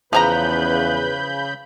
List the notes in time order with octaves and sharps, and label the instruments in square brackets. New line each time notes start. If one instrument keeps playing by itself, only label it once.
[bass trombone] E2 [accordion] C#3 B5 G6 [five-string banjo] F3 G#4 A#5 [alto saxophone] B4